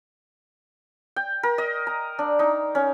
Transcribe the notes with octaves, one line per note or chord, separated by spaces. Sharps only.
G5
A#4
D#5
A#5
D4
D#4
C#4